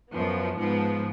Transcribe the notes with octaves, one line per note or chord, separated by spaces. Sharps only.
F#2 F3 B3
G#2 F3 B3